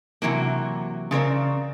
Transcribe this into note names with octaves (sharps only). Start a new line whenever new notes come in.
C3 E3 F#3 A#3
C#3 C4 A#4 D5